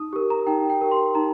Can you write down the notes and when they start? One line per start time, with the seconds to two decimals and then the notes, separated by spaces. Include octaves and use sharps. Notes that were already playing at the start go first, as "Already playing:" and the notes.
Already playing: D#4 D#6
0.13 G4 A#4
0.30 A#5
0.47 D#4 G5
0.70 G5
0.81 G4 A#4
0.91 C6
1.15 D#4 A#5